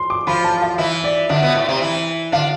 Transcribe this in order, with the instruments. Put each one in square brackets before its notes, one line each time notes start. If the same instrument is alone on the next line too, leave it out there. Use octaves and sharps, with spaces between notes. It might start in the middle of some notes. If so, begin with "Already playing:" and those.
Already playing: [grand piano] C6
D6
[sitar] F3 F4 [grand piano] B5
[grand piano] A5
F5
[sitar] E3 E4 [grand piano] E5
[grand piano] D5
[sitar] D3 D4 [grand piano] E5
[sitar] B2 B3
A2 A3
C3 C4
E3 E4
[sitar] D3 D4 [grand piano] F5